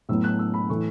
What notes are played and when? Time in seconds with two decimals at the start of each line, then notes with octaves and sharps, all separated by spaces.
0.09 A2 F#3 B3 E6
0.24 F#6
0.39 E6
0.54 B5
0.69 A2 E3 A3 C#6